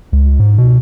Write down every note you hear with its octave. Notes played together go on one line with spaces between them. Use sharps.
C#2
G#2
B2